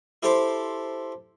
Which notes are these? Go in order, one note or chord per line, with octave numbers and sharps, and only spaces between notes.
E4 G4 A4 C5